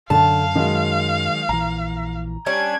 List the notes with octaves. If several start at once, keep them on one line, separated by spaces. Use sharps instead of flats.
F#2 D3 F5 A5
D#3 F#3 G#3
A#1 E3 A#5
G3 C#4 D4 G#6